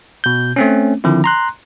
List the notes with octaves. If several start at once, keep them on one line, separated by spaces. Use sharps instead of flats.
B2 G6
A3 C4 C#4
D3 D#3 F3 C4 E4
A#5 C6 F#6